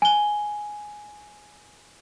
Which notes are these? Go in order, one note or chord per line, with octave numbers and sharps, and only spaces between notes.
G#5 G7